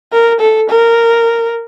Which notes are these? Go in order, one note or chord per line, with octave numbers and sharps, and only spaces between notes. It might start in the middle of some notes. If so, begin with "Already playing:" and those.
A#4
A4
A#4